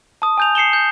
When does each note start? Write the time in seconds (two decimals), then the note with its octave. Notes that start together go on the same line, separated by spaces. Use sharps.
0.22 A5 D#6
0.38 G#5 G6 F7
0.55 C7 C#7 E7 G7
0.73 G6